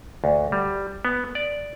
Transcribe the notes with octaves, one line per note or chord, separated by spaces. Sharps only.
D2
G3
B3
D5